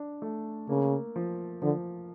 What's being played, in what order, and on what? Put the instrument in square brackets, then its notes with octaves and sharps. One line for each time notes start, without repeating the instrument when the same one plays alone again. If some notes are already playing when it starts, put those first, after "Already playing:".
Already playing: [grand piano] D4
A3
[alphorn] C#3 [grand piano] A#3
[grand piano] F3
[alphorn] D3 [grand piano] F3